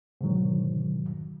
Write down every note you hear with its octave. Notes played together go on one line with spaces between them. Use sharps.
G#2 B2 D3 D#3 F#3